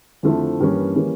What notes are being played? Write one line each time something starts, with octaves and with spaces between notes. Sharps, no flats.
F2 D3 F3 A3 E4
G2 E3 G3 A#3 C#4
E3 G3 A#3 C#4